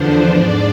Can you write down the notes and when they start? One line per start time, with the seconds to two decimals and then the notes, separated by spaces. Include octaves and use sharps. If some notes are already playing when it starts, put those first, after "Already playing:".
Already playing: E2 D3 F3 B3 D4 C5
0.30 G#2 G#3 D4 D5